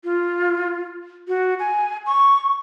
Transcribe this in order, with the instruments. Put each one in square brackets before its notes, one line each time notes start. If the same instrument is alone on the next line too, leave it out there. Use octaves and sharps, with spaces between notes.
[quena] F4
F#4
G#5
C#6